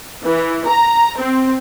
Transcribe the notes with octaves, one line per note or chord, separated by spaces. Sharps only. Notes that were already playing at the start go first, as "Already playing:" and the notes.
E3
A#5
C4